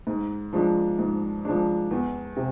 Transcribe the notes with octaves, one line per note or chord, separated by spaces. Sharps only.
G#2
F3 G#3 D4
G#2
F3 G#3 D4
E2
C3